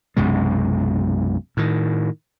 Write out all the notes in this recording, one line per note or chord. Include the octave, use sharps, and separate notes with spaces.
B1 F#2 C3 G#3
A2 D#3